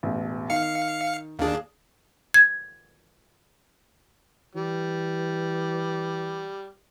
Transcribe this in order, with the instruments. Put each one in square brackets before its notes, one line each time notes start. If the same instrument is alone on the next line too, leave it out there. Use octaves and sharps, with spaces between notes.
[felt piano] E1 A1
[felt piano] D#3 [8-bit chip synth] F5 C#7
[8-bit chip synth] D#2 D4 [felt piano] G#4 F5
[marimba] G#6
[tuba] E3 [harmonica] G3